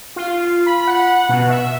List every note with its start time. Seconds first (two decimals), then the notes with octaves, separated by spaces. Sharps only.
0.16 F4
0.66 B5
0.87 F#5
1.29 B2
1.50 E5